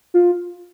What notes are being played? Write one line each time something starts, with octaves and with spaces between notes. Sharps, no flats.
F4